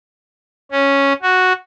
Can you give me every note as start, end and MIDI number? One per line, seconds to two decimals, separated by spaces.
0.71 1.13 61
1.22 1.53 66